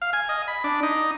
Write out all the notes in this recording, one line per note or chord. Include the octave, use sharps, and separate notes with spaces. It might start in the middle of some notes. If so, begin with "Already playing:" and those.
F5
G#5
D#5
B5
D4
D#4